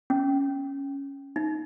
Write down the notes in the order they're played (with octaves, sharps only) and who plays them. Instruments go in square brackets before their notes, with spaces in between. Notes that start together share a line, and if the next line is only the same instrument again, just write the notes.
[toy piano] C#4
D#4